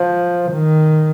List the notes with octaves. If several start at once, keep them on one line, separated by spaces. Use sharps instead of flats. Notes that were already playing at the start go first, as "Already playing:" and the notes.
Already playing: F3
D#3